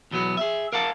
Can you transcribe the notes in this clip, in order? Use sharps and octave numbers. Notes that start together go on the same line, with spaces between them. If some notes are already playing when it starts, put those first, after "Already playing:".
E2 B2 F#3 B3
G#4 E5
A#4 F5 F#5 A5